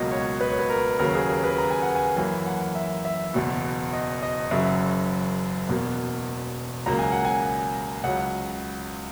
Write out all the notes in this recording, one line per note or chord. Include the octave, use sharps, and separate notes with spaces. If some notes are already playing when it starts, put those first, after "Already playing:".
Already playing: C#2 B2 F#3 A#3 D#5
C#5
B4
C#5
B4
A#4
D#2 C#3 F#3 A#4
G#4
A#4
B4
A#5
G#5
F#5
G#5
F#2 E3 A#3 G#5
F#5
E5
E5
F#1 E2 B2
D#5
D#5
F#1 F#2 C#3 F#3 E5
E1 E2 B2 A#3
C#2 C#3 F#3 A#3 A#5
G#5
F#5
G#5
C#2 C#3 F#3 F#5